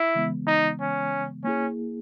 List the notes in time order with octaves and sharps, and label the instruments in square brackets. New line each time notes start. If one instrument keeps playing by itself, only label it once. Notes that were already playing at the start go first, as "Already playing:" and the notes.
Already playing: [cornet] E4
[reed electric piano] C#3 E3 G#3 B3
[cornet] D#4
C#4
[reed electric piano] A#3 E4 G#4 [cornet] C#4